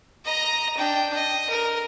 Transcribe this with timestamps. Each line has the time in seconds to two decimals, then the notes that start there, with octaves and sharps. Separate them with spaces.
0.25 D#5 A#5
0.77 D4 G5
1.15 D#5
1.49 A#4